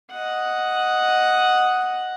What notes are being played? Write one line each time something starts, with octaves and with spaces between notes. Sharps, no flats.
D#5 F#5